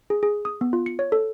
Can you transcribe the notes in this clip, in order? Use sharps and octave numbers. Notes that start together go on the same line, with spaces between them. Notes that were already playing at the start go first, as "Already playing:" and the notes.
G#4
G#4
D#6
B3
F4
C#7
C#5
A4